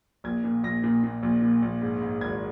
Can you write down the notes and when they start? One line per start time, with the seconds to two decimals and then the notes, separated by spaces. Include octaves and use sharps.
0.24 A#1 G#6
0.44 A#2
0.63 A#1 A#6
0.84 A#2
1.03 A#2
1.23 A#1
1.42 A#2
1.62 A#1
1.82 G#2
2.02 G#2
2.21 G#1 G#6